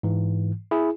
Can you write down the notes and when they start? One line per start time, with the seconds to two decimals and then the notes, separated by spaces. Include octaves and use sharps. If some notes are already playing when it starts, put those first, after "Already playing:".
0.03 G#2 E3
0.71 E4 G#4